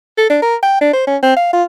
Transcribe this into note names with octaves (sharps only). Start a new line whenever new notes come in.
A4
D4
A#4
G5
D4
C5
C#4
C4
F5
F4